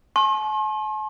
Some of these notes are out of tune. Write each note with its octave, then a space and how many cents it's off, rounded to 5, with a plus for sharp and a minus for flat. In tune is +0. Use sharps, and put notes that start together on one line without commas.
A5 -45 C6 +45